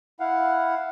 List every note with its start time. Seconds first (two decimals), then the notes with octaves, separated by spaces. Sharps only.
0.20 E4 F5 F#5